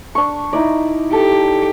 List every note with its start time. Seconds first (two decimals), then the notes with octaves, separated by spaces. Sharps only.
0.15 D4 C#6
0.53 D#4 E4 D5
1.13 G4 A4